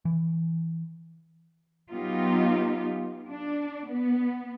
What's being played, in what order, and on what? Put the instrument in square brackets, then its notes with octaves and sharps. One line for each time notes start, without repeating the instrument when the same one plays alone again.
[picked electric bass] E3
[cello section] F#3 B3 D#4 F4 G4
D4
B3